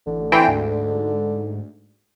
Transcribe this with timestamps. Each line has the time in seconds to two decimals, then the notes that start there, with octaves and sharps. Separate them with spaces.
0.07 A1 D3
0.32 E3 C4 G5
0.48 D2 G#2